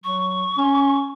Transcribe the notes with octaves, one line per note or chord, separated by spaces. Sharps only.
F#3 C#6
C#4